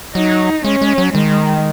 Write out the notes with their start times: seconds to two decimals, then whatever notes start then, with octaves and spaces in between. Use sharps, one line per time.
0.15 F#3 D#4
0.65 G#3 C#4
0.82 G#3
0.98 F#3
1.14 D#3 G#3